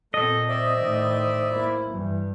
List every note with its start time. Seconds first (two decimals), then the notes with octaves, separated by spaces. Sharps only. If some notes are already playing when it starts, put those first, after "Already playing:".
0.14 A#2 C4 A4 D#5
0.49 C5 D5 E5
0.80 A2 D#3
1.50 A#3 E4
1.91 G2 E3